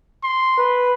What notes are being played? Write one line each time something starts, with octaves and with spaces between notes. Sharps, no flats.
C6
B4